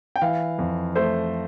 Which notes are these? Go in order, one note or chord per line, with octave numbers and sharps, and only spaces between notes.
G5
E3 F5
F2
A3 C5